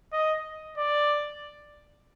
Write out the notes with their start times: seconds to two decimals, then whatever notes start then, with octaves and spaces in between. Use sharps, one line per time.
0.13 D#5
0.78 D5